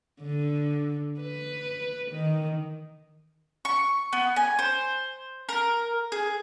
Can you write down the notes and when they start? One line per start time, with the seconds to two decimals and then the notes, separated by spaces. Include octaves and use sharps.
0.22 D3
1.20 B4
2.12 D#3
3.65 C#6
4.13 B3
4.36 G#5
4.59 C5
5.49 A#4
6.12 G#4